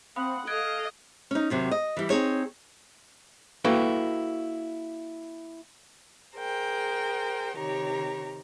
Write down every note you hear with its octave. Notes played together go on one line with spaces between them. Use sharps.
C4 F5 F#5 B5 D#6
A4 D#5 F5 F#6 G#6 D7
C#4 D#4
D#2 C3 F#3
D#5
E3 G3
C4 D#4 G#4 C#5
A#3 E4 F#4 A4 B4 G5
G#4 A#4 C5 G5
C3 D#3 G4 C#5 A#5